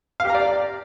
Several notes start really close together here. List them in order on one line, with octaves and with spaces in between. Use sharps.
F5 G4 A#5 D5